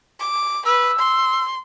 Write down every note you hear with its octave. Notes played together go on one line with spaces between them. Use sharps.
D6
B4 E6
C6